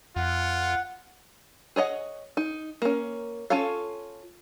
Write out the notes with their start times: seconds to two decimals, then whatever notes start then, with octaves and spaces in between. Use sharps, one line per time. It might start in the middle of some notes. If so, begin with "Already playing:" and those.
0.16 F2 F4 F#5
1.76 G#4 C#5 D#5 F#5
2.37 D#4
2.82 A#3 C#4
3.50 C#4 F4 A4 C#5 F5